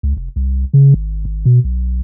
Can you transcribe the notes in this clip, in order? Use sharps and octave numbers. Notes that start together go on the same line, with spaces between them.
C#2
F1
C2
C#3
G#1
G#1
B2
B1